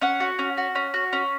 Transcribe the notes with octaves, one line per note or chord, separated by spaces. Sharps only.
C#4 F#5
F#4
C#4
F#4
C#4
F#4
C#4